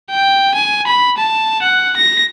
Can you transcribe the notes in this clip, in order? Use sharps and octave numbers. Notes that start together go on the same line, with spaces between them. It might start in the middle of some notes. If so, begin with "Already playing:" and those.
G5
G#5
B5
A5
F#5
A#6